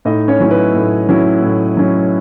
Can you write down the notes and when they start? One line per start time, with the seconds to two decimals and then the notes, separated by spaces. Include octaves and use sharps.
0.05 A2 D#4 D#5
0.28 C#4 C#5
0.40 F#3 C#4 E4
0.51 B4
0.74 A2
1.09 F#3 C#4 E4
1.43 A2
1.77 F#3 C#4 E4